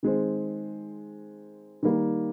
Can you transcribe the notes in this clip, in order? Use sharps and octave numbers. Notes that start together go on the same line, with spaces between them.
D#3 G#3 C4
D#3 G3 A#3